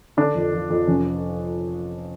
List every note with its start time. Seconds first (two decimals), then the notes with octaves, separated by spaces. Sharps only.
0.17 D3 D4
0.35 F2
0.53 F3
0.70 F2
0.87 F1 C#4